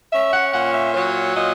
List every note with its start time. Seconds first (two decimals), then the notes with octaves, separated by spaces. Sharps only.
0.13 C#4 E5
0.33 F#5
0.54 A#2 F#5
0.74 E5
0.94 F#3 C#5
1.36 A#2 D#5